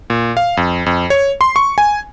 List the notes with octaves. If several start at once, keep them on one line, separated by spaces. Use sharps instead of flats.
A#2
F5
F2
F2
C#5
C6
C#6
G#5